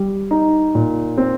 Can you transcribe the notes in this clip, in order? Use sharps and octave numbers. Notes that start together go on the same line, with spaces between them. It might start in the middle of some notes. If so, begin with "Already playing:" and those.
Already playing: G3
D#4
A#2
C4